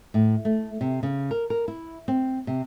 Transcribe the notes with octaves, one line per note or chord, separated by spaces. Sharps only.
A2
A3
C3
C#3
A#4
A#4
E4
C4
C3